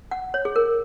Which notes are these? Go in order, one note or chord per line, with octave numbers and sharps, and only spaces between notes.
F#5
C#5
G#4
A#4